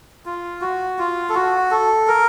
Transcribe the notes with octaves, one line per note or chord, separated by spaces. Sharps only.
F4
F#4
F4
A4
F#4
A4
A#4